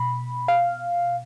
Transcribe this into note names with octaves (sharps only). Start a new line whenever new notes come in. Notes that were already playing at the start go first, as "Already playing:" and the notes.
Already playing: B2 B5
F5